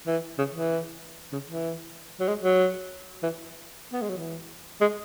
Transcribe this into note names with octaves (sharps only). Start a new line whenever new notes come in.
E3
C#3
E3
C#3
E3
F#3
G#3
F#3
E3
B3
G#3
F#3
E3
G#3